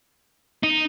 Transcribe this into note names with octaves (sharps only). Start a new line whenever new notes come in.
D#4